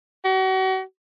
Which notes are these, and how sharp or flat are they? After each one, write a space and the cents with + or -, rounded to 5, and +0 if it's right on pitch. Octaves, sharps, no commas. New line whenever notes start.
F#4 +40